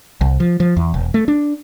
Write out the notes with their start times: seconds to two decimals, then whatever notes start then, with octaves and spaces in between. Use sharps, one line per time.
0.21 C2
0.40 F3
0.60 F3
0.77 E2
0.94 E1
1.14 A3
1.28 D4